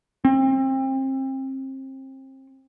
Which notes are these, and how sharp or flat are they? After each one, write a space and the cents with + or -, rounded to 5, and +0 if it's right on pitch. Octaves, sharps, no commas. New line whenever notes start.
C4 +30